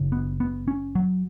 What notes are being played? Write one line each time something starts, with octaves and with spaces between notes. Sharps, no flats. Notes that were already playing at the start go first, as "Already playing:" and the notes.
Already playing: F#1 F#2 C#3
B3
B3
C#4
F#3